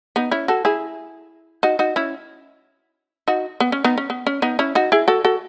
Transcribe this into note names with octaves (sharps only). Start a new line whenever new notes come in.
B3 D#4
C#4 E4
F#4 A4
E4 G#4
D#4 F#4
D#4 F#4
C#4 E4
D#4 F#4
B3
C#4
B3 D#4
C#4
B3
C#4
B3 D#4
C#4 E4
D#4 F#4
E4 G#4
F#4 A4
F#4 A4